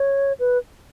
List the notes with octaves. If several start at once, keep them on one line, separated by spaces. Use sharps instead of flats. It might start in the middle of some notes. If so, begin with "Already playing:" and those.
Already playing: C#5
B4